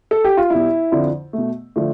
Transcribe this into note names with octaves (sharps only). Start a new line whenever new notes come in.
A4
G4
F4
B2 G3 E4
F2 D3 F3
B2 A3
D3 F3 A3